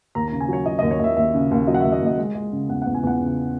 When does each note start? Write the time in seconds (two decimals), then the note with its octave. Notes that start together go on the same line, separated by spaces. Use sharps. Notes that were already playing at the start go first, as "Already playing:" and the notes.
0.15 D#2 A#5
0.28 C#3 A#5
0.40 G#5
0.48 F#3 C#5
0.66 F#3 D#5
0.79 D#2 D#5
0.91 C#5
1.00 D#2 D#5 E5
1.17 D#2 E5
1.34 C#3
1.51 D#2
1.67 F#3 D#5
1.74 F#5
1.80 D#2 E5
1.92 D#5
2.01 D#2
2.06 D#5
2.18 G#3
2.35 G#3
2.53 C#3
2.69 E2 F#5
2.82 E2 F#5
2.94 G#5
3.03 E2 F#5
3.20 C#3